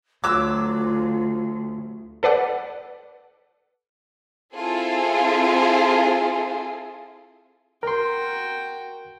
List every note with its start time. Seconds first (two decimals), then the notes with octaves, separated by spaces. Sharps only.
0.24 D2 F#3 F4 D6 E6
2.23 A4 B4 D5 F#5
4.55 C4 E4 F4 G#4 A4
7.83 F#4 A#4 G5 C6